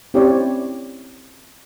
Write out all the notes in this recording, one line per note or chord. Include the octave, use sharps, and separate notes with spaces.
C4 C#4 E4 G4 C#5 D5